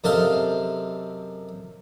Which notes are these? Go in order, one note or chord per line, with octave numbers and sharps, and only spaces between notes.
F#2 C3 A4 D#5 F5 C6